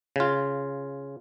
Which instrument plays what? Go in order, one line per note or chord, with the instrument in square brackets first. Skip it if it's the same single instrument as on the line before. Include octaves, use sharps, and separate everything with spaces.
[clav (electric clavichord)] C#3 F4